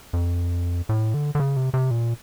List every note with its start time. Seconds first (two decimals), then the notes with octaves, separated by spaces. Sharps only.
0.13 F2
0.89 A2
1.14 D3
1.35 D3
1.40 C#3
1.56 C3
1.74 C3
1.91 A#2